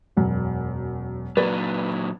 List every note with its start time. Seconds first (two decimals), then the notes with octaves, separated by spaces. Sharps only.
0.17 E1 F#2
1.37 A#2 F#3 B4 D5 A6